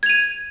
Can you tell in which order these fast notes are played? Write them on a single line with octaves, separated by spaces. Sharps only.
G#6 F7 D#7